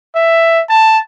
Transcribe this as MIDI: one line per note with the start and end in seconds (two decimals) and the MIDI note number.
0.15 0.61 76
0.69 0.98 81